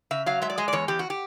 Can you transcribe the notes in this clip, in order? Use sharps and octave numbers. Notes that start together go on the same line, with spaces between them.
C#3 E5
F#3 F5
G#3 E5
D5
G#3 D#5
D5
E2 C#5
E2 G4
F#4
G4